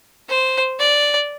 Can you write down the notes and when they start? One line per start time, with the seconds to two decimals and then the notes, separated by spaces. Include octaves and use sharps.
0.29 C5
0.80 D5